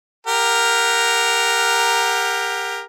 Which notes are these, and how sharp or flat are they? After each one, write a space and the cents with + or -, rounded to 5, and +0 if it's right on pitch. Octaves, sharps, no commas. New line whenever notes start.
G4 +25 A#4 +0 F#5 +0